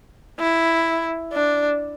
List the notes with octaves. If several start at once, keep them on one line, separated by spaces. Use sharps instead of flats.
E4
D4